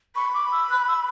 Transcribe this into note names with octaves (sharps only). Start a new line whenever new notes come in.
B5 C#6
D6
E6
F#6
E6